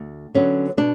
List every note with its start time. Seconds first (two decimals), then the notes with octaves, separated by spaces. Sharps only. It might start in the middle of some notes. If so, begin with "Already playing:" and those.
Already playing: D2
0.35 D3 F#3 B3 C#4
0.77 B2 D4